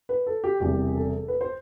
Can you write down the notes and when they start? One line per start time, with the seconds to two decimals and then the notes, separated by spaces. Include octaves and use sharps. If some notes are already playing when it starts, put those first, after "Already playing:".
0.09 B4
0.27 A4
0.44 G4
0.60 E1 E2 C3 G3 G4
0.95 A4
1.28 B4
1.41 C5